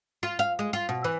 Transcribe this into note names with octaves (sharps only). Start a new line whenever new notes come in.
F4
F5
G#3
F4
B2
E3